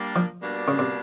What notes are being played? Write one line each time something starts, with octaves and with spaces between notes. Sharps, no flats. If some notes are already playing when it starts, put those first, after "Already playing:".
Already playing: G3 A#3 D4
F3
B2 G3 A#3 D4
C#3
C3